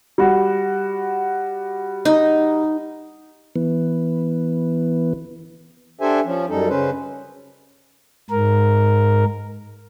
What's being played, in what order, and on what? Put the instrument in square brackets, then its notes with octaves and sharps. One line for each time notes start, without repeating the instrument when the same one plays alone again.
[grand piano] G3 F#4
[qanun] D#4
[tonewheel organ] E3 B3
[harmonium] D4 G4 A4 C5 E5 G#5
F3 C#4
F#2 G3 D#4 A4
C#3 C#4 B4 C5
[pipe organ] G#2 A#4